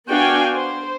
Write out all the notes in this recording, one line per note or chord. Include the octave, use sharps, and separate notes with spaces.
B3 D4 F#4 F5 G5 G#5
C5